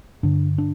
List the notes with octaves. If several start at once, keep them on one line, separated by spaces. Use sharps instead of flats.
G2 D3 D4
D4